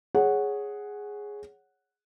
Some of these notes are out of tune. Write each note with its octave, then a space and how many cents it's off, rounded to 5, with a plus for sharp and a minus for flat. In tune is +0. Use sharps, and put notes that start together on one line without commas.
G#4 +0 C#5 +0 F#5 +0